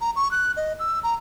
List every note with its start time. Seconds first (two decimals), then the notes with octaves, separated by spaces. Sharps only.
0.01 A#5
0.16 C#6
0.31 F#6
0.57 D#5
0.79 E6
1.03 A#5